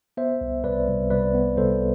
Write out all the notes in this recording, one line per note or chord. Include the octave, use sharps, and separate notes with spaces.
B3 C5 E5
C2
C2 B4 D5
C2
C2 B4 D5
B3
C2 A4 C5